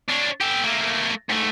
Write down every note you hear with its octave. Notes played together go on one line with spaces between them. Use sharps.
D4 C#5
G4 A4
A3 A#3
G#2 A3